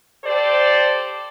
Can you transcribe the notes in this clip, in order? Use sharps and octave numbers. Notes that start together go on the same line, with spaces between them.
G4 A4 C5 D5